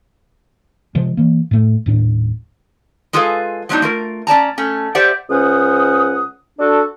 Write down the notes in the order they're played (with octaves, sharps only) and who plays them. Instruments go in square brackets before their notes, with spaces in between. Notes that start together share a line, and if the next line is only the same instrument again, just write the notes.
[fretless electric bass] C3 F3 G#3
E3 A#3
A2 A3
D#1 A2 D4
[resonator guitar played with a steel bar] G#3 F4 G#4 A4 B4 F5
F#3 G#3 B3 C4 D4 D#4
A3 F4 A#4
C#4 D5 A5 A#5
A3 C#4
G4 C5 D5 E5 F#5
[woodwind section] C#2 C#4 C5 F#5 D#6
D4 F#4 A4